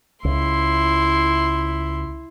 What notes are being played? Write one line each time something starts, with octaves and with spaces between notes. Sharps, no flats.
C#2 E4 C6